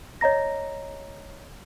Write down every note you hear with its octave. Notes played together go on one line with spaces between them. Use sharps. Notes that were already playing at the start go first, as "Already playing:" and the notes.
C#5 D#5 A#5 A#6